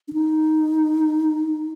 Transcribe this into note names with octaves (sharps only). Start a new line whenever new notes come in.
D4
D#4